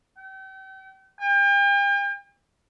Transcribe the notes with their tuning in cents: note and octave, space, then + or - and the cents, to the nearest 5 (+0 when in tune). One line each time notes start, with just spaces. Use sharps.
G5 -40
G5 +40